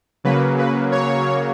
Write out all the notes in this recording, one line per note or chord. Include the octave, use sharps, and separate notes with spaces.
C#3 F#3 A#3 B4
B4
C#5